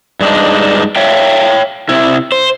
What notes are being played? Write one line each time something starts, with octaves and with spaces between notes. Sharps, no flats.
G2 G#3 D4 D#4
C#5 E5 F5 G5
C3 E4
C5